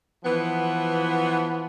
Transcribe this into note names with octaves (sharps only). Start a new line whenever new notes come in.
E3 F3 B3